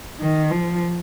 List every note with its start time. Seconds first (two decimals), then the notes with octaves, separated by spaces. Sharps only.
0.20 D#3
0.51 F3